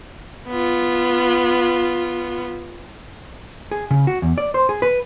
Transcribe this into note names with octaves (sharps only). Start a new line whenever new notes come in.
B3 F4
G#4
C#3
F#4
E2
D5
C5
G#4
B4